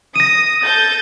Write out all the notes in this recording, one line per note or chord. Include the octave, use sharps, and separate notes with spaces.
D#6 A#6 D#7
A4 G6 A6